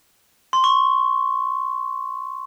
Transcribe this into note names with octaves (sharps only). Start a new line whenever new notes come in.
C6
C#6